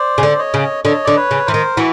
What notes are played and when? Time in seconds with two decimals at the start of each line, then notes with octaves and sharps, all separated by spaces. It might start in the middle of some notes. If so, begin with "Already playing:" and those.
Already playing: C5 D5
0.18 C#3
0.23 D3
0.39 C#5 D#5
0.54 C#3
0.84 D3 C#5 D#5
1.04 D3 D5
1.16 B4 C#5
1.31 C#3
1.46 E3 A#4 C5
1.54 D#3
1.77 E3 F#4